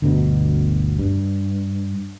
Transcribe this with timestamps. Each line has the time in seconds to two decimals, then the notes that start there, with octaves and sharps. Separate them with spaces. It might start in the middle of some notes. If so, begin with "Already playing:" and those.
0.02 G1 D2 B2 D3
0.99 G2